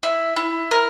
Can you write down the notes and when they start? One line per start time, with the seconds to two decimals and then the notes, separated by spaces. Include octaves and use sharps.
0.03 E4
0.36 E4
0.71 A#4